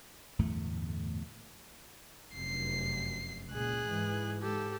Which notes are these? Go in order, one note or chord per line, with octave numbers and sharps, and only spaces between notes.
G1 E2 A2 A3
F1 F#2 C7
C#2 A#2 G#4 F#6
G#2 E3
G#2 G4 A4